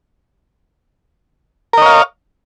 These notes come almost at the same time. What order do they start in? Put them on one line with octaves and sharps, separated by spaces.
A#4 D#5 C#5 F5